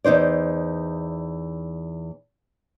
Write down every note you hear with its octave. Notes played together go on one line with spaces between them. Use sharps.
E2 D#4 C5 D5